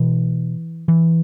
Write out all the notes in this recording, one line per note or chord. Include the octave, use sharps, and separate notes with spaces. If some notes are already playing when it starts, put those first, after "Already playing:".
Already playing: B2 E3
E3